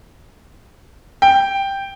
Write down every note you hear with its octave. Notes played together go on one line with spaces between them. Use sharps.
G5